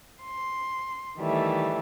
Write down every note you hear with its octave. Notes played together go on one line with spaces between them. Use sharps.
C6
D#3 E3 G3 A3